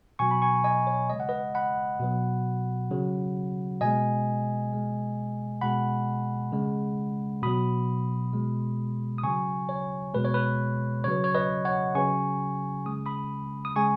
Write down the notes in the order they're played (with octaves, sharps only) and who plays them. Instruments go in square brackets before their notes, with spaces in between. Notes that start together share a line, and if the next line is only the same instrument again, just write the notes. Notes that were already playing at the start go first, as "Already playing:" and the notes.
[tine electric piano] B2 F#3 G#5 C#6
B5
G#5 C#6
D#5 G#5
C#5
C#3 G#3 D#5
F#5
B4 D#5
F#5 B5
B2 F#3
C#3 F#3
B2 G#3 D#5 G#5
B2 G#3
B2 G#3 F#5 B5
C#3 G#3
B2 F#3 B5 D#6
B2 G#3
D#6
C#3 F#3 G#5 C#6
C#5
B2 G#3 B4
C#5
B4
C#3 F#3 C#5
C#5
B4 D#5
C#5 F#5
C#3 F#3 G#5 C#6
C#3 G#3 D#6
B5 D#6
D#6
C#3 G#3 G#5 C#6